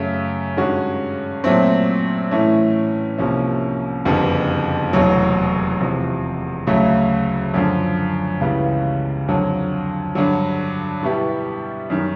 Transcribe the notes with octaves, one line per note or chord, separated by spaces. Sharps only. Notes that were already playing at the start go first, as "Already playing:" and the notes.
Already playing: F#2 C#3 F#3 A3
G2 D#3 G#3 C#4 F#4
A#2 F#3 A3 C4
A2 E3 A3 C#4
C2 C3 F3 A#3 C#4
F#1 F2 D3 G3 B3
F1 E2 B2 F#3
E2 C3 F3
D2 C#3 F#3 A3
F#2 D3 F3
C#2 C#3 E3 G3 B3
F2 D3 F#3
G2 D3 F#3
B2 G3 B3 E4 G4
F#2 D#3 G3